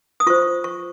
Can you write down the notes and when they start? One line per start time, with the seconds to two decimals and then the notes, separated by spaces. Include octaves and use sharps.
0.20 D#6
0.27 F4 C5 C#6
0.64 C#6